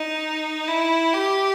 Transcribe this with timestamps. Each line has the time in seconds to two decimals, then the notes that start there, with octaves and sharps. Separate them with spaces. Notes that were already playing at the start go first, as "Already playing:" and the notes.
Already playing: D#4
0.68 E4
1.13 G4